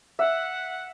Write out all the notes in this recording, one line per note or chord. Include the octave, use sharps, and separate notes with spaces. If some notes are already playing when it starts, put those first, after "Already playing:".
E5 F#5